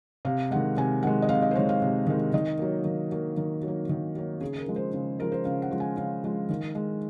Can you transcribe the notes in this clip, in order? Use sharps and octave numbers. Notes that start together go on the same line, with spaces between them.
C3 F5
D#3 G#3 F#5
C3 G#5
D#3 G#3 F#5
D#5
C3 F5
D#5
C5
D#3 G#3 C#5
F5
C3
D#3 G#3
D#3 D#5
F#3 A#3
D#3
F#3 A#3
D#3
F#3
A#3
D#3
F#3 A#3
C#3 G#4
A#4
F3 G#3
C5
C#3
F3 G#3 A#4
C5
C#3 F5
F#5
F3 G#3
G#5
C#3 F5
F3 G#3
D#3
G#3